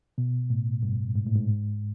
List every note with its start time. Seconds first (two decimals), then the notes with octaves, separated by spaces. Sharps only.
0.18 B2
0.50 A2
0.83 G2
1.15 G#2
1.27 A2
1.36 G#2